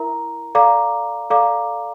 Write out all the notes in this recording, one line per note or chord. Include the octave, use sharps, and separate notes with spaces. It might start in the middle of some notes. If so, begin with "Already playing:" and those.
Already playing: E4 A#4 E5 A#5
A4 D5 F5 A#5 D6
A4 D5 F5 A#5 D6